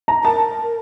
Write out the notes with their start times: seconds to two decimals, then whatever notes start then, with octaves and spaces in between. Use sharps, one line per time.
0.08 A#5
0.24 A#4 A5